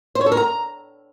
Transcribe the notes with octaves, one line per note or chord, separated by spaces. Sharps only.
C5
C#5
A4
A#4
A#5